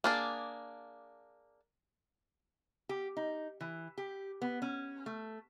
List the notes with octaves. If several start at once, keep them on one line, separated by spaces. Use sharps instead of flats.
A#3 D4 G#4
G4
D#4
E3
G4
B3
C#4
A3